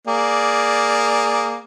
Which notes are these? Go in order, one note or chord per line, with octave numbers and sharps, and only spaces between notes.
A#3 G#4 D5